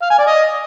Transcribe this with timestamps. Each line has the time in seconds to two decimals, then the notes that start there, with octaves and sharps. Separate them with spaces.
0.02 F5
0.10 G#5
0.19 D5
0.27 D#5